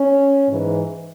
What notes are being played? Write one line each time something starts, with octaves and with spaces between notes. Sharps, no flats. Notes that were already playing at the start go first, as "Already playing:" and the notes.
Already playing: C#4
G#2 E3